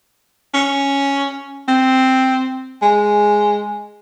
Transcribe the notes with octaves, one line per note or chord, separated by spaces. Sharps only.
C#4
C4
G#3